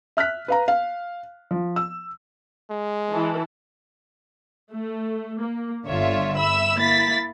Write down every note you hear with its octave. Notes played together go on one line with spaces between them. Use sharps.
E5 F6 F#6 B6
B4 F5 A#5
F5
F3
E6
G#3
E3 A5
A3
A#3
G1 D3 F4 C#5 E5
E5 B5 E6
A#3 E4 A6 B6